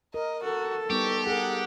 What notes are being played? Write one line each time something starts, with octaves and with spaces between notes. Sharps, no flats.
A#4 D#5
F#4 A4
G3 B3 D#4 G4 C#6
G#4 A#4 F#5